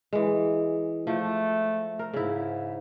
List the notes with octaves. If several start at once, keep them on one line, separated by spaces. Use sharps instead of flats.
E3 G#3
F3 A3
A#4
G#2 C#3 E4